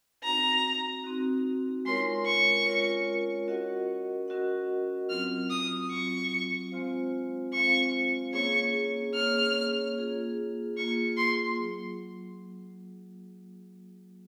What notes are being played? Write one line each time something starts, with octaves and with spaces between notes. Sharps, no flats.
C4 D#4 F#4 A#5
C4 D#4 F#4
G#3 C#4 F4 A#4 C#5 C6
C#6
G#3 C#4 F4 A#4 C#5
C#4 F#4 A#4 D#5 F#5
C#4 F#4 A#4 D#5 F#5
F#3 C4 F4 F6
D#6
F#3 C4 F4 C#6
G#3 C4 F4 C5 F5
G#3 C4 F4 C5 F5 C#6
A#3 C#4 G#4 C#5 C#6
A#3 C#4 G#4 C#5 F6
A#3 F4 G#4
A#3 F4 G#4 C#6
C6
F#3